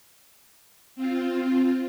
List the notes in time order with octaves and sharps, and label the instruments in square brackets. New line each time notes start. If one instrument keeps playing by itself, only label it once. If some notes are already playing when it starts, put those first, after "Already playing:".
[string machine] C4 F4